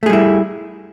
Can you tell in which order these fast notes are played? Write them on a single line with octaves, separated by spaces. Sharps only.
A3 G#4 G3 E4